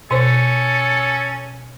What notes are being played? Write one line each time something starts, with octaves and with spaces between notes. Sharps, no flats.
B2 C#4 A4 C5